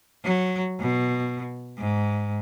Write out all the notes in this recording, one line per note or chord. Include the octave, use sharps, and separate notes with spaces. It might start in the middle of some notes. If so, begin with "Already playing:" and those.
F#3
B2
G#2